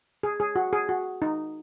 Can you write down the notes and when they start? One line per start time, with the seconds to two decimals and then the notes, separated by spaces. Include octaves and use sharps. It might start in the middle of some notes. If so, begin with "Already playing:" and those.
0.23 G#4
0.40 G#4
0.56 F#4
0.73 G#4
0.89 F#4
1.22 D#4